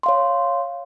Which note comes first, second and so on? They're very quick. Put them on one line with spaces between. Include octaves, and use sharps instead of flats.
C6 F5 C#5